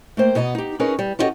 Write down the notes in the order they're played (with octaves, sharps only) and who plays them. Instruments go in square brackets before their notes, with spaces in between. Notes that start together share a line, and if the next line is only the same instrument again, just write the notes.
[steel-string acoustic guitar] A3 A#3 C5 G5
B2 B3 D#5 A5 A#5
D#4 G4
C#4 D#4 G#4 A#4 B4 C#5
G3
C#4 E4 F#4 G4 A4 D#5